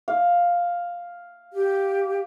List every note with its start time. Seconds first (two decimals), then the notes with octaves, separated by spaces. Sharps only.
0.08 F5
1.53 G4